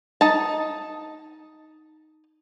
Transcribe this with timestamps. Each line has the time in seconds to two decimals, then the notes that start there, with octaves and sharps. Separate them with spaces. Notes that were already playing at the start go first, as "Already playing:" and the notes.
0.21 D#4 A5